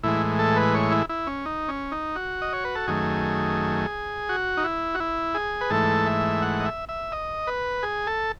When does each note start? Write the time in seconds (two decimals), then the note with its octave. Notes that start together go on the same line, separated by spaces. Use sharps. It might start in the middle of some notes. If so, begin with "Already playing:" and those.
0.03 A2 E3 G#3 E4
0.39 A4
0.56 B4
0.74 C#5
0.92 E4
1.09 E4
1.27 C#4
1.46 D#4
1.68 C#4
1.92 D#4
2.16 F#4
2.42 D#5
2.53 C#5
2.65 B4
2.75 A4
2.87 F#2 D#3 A3 G#4
4.29 F#4
4.57 D#4
4.64 E4
4.95 F#4
5.00 E4
5.35 G#4
5.61 B4
5.70 G#2 E3 A3 A4
6.06 E5
6.42 F#5
6.60 D#5
6.65 E5
6.89 E5
7.12 D#5
7.47 B4
7.83 G#4
8.07 A4